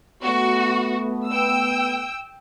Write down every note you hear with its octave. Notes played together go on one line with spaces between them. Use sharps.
A3 B3 F#4
G5 E6